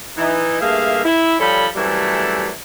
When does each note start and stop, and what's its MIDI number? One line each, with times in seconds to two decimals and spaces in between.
0.17 0.57 52
0.17 0.57 63
0.60 1.01 43
0.60 1.01 57
0.60 1.01 58
0.60 1.01 68
0.60 1.01 76
0.60 1.01 77
1.04 1.35 64
1.40 1.66 53
1.40 1.66 55
1.40 1.66 69
1.40 1.66 73
1.40 1.66 80
1.40 1.66 83
1.76 2.50 42
1.76 2.50 48
1.76 2.50 52
1.76 2.50 55
1.76 2.50 57